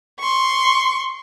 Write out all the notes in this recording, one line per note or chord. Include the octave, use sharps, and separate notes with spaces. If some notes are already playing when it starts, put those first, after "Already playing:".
C6 C#6